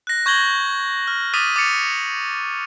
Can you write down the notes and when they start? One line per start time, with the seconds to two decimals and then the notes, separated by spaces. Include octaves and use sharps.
0.07 F#6 A#6
0.26 C#6 G6 G#6 A#6 F#7 G7
1.08 F6
1.34 D6 D#6 F6 A6 B6 D#7
1.56 D6 A6 C#7 F7